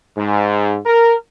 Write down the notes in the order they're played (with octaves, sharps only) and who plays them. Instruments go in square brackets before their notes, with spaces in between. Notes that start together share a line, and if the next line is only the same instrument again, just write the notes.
[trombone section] G#2
A#4